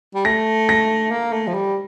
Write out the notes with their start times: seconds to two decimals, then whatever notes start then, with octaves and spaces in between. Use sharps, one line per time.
0.15 G3
0.25 A3 A#6
0.69 A#6
1.11 A#3
1.33 A3
1.47 F3
1.54 G3